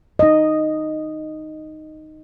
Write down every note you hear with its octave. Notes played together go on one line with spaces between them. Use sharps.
D#4 D#5